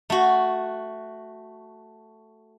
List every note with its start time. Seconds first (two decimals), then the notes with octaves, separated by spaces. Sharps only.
0.10 A3 F#4